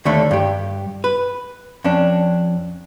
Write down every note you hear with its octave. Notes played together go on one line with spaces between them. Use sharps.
D#2 D3 A3
G2 G4
B4
F2 C#4 D4